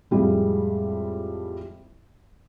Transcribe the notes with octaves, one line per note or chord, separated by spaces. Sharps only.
F2 A2 G3 G#3